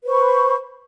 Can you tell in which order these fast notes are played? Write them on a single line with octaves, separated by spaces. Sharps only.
B4 C5 C#6 B5